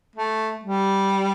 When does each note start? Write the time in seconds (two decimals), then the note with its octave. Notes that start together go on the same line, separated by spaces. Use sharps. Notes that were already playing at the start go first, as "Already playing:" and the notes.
0.16 A3
0.64 G3